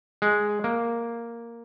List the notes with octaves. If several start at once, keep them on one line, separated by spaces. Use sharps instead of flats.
G#3
A#3